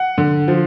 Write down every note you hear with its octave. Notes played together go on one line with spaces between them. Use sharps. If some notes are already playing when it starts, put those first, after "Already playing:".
Already playing: F#5
D3
F3